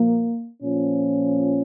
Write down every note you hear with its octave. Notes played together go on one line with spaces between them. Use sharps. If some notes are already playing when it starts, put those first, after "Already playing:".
Already playing: A#2 F3 A#3
A#2 F3 C#4